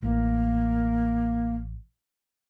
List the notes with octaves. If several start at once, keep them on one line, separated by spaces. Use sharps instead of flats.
A1 A#3